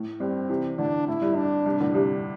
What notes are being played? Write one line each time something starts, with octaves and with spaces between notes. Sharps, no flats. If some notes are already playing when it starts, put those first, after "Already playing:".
Already playing: A2
G2 C4
C3 E3
A2 D3 D4
A2 E4
G2
D4
G2 C3
A2 D3
G2 C3